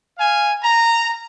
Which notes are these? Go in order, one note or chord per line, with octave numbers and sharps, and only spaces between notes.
F5 G#5
A#5